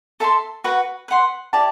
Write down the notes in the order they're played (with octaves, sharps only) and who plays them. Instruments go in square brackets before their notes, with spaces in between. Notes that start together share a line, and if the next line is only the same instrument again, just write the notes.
[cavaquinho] A4 E5 A5 C6
F#4 B4 F#5
B4 F#5 C6
E4 G4 D5 A5